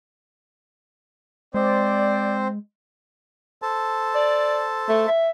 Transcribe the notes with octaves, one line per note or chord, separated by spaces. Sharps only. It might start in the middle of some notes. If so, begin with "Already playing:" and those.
G#3 C4 C5 D5
A4 C5 A5
D5
A3
E5